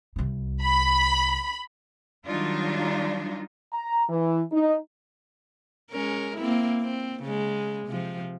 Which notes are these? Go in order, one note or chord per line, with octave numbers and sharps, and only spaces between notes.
C2 G3
B5
D#3 F#3 G3 D4 D#4 F4
A#5
E3
D#4
G#3 C#4 A#4
A#3 C4 E4
C4
C#3 G#3
C3 F3